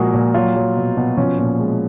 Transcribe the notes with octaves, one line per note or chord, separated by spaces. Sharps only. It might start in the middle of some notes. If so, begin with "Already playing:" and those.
Already playing: A#2 F3 G#3 F#4 G#4 A#4
A#2
F#3 F4
F#3
B2
B2
F3 C#4
A#2
G#3